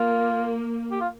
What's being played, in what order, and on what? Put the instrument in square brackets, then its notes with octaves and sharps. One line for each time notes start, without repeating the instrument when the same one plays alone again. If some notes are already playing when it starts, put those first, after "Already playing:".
Already playing: [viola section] A#3 [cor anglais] F4
[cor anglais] G4
F4